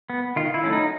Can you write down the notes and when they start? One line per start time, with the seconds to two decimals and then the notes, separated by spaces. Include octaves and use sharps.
0.10 B3
0.36 D#3 F4
0.54 E4
0.64 F#3 A3 C#4
0.73 D#4